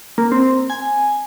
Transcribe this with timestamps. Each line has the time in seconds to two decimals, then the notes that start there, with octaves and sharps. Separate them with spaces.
0.18 A#3
0.32 C4
0.70 G#5